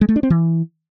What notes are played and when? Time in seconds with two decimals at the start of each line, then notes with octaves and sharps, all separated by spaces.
0.01 G#3
0.09 A3
0.16 D4
0.23 C4
0.30 E3